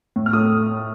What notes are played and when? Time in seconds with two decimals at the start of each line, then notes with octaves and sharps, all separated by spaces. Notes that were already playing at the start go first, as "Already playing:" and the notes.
0.16 A2
0.26 F6
0.33 A3 D#6